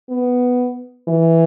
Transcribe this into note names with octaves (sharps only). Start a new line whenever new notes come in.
B3
E3